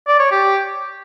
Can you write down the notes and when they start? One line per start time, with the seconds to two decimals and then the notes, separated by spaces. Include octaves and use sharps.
0.07 D5
0.19 C#5
0.31 G4